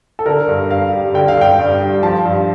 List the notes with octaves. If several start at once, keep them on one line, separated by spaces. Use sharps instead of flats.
A4
D3 A#4
G2
G2 F5
G3
D3 G5
F5
G2 G5
G2
G3
F3 A5
G2